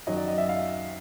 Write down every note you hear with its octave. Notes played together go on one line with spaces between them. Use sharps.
F#2 D#3 F#3 D#5
D5
D#5
E5
F5